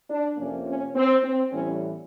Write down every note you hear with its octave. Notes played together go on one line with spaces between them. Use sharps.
D4
F2 C3 F3 A#3 C#4
C#4
C4
C4
A2 E3 G3 B3 C#4